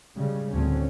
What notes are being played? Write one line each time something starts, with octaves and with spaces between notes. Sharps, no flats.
C#3 G3 G#3
D2 A2 D3 C4 C#4